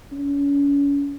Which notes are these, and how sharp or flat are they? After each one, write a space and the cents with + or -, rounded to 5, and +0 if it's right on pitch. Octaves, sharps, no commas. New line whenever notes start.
C#4 +35